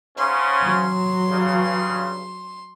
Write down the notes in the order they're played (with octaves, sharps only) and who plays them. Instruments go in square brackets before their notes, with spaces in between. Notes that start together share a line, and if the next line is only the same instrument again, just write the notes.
[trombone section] G#2 C#3 C#4 [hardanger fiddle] C6
[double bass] F#3
[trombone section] G2 C#3